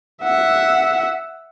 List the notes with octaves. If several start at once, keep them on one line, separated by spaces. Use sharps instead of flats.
E5 F#5